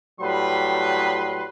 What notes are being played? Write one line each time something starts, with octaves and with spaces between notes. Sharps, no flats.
A2 F#3 G3 B4 C6